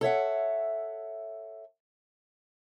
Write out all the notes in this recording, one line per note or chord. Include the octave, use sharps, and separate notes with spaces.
A4 C#5 E5 F#5